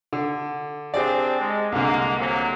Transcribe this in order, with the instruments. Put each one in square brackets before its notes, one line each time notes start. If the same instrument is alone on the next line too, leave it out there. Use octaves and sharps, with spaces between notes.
[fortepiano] D3
[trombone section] C4 D4 [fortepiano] G4 G#4 D5
[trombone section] G#3
[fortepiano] C2 D3 [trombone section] G#3 A#3
[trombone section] C3 F#3 A#3